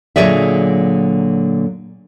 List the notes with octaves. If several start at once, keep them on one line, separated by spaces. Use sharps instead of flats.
A#2 D3 F#3 G#4 D5 E5